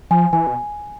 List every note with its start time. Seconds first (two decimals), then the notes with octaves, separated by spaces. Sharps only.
0.11 F3 G#5
0.33 E3 G#5
0.47 B2